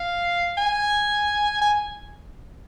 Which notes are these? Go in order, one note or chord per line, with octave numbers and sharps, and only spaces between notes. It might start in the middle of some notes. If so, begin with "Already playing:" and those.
Already playing: F5
G#5
G#5